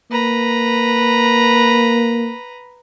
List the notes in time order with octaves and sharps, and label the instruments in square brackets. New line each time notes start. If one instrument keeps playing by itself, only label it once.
[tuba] A#3 [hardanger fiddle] B4 A#5